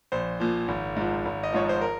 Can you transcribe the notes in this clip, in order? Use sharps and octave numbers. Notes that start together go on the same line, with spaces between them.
A#1 C5
A#2 F3
G#1
G#2 F3
G#1
D#5
G#2 F3 C#5
C5
A#4